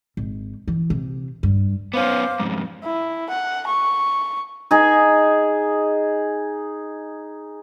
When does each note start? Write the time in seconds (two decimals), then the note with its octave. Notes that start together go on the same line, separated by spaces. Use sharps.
0.17 G#1
0.68 E3
0.90 C3
1.43 G2
1.93 B3 C#4 C5 F5 D6
2.40 F2 G#2
2.83 E4
3.29 F#5
3.67 C#6
4.71 D#4 G#4